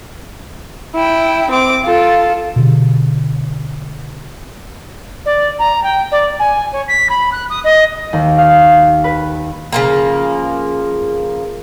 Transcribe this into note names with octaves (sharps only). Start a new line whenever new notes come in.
E4 G5
C4 D6
F4 A4
B2 D3
D5
A#5
G5
D5
G#5
C#5
B6
B5
F#6
D#6
D#5
D#2
F5
B4
C#3 F3 A#3